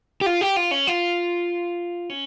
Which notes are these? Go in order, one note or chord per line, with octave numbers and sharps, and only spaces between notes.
G4
F4
G4
F4
C#4
F4
C#4